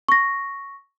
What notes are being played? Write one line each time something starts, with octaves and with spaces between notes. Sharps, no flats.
C#6 A#6